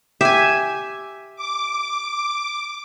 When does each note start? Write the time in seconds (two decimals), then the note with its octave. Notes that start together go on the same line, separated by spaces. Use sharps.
0.21 G4 E5 G#5
1.36 D6